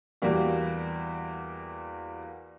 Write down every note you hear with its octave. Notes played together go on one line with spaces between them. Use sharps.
E2 G3 A#3 F#4